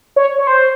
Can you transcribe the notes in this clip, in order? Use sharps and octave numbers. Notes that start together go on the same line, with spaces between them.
C#5
C#5
C5